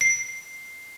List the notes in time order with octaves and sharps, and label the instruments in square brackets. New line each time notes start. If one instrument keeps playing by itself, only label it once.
[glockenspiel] C7